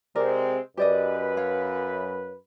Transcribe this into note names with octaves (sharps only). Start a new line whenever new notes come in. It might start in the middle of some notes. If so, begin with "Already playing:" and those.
C3 G#3 C4 A#4 D5
F#2 G4 B4 D5 D#5
C#5 F5